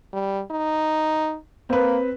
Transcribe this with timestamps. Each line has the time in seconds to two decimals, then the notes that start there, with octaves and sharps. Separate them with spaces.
0.13 G3
0.51 D#4
1.70 A#3 C4 B4